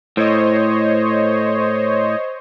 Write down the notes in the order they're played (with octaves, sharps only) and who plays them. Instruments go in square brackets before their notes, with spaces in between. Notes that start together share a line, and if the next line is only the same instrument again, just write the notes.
[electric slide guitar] A2 [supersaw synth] C5 C#5 D#5